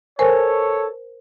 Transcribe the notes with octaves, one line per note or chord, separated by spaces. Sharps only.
A4 A#4 C5 C#5 G#5